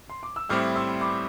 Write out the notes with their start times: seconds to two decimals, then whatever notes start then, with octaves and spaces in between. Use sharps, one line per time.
0.10 C6
0.23 D6
0.36 E6
0.49 A2 G3 C4 E4 D6 F6
0.76 C6 E6
1.01 B5 D6